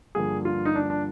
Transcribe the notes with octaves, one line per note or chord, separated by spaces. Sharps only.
G2 D3 F3 A#3 G#4
F4
D#4
D4
D4